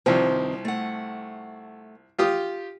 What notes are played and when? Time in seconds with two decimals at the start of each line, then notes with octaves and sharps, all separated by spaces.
0.06 C2 G2 D#3 F3 C4
0.65 A3 F#5
2.19 F4 G4 D#6